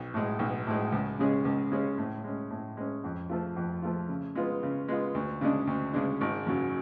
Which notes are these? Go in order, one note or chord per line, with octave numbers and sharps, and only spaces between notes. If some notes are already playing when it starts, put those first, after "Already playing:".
Already playing: B1
A2 G#3
B1
A2 G#3
C#2
C#3 G#3 C#4 G#4
C#2
C#3 G#3 C#4 G#4
A2
G#3 C#4
A2
G#3 C#4
F2
F3 A3 F4
F2
F3 A3 F4
C#3
G#3 B3 F4
C#3
G#3 B3 F4
D2
C#3 G#3 D4
D2
C#3 G#3 D4
G#1
F#2 C#3 F#3